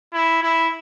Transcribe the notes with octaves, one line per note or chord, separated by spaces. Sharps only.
E4
E4